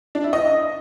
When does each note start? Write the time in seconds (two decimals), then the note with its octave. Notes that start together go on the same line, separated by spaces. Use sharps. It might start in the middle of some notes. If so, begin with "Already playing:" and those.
0.15 D4
0.24 E4
0.33 D#5